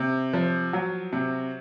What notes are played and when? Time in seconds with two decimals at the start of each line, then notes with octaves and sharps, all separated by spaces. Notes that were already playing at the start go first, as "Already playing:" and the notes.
Already playing: C3
0.33 F3
0.73 F#3
1.13 C3